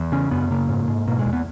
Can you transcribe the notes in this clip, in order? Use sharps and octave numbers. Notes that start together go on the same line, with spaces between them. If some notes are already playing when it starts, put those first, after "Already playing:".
Already playing: E2
C#3 C#4
F#2 B3
C#3 A#3
G#2
G#2
B2 A#3
G#3
E2
B3